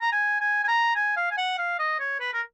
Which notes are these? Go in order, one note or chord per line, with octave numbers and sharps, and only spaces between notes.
A#5
G#5
G#5
G#5
A#5
G#5
F5
G#5
F#5
F5
D#5
C#5
B4
A#4